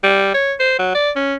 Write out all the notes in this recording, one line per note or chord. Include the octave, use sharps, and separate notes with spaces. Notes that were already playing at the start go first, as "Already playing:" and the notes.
G3
C#5
C5
F#3
D5
C#4